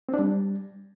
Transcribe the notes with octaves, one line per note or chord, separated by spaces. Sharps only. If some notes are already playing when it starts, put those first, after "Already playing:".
C4
D4
G3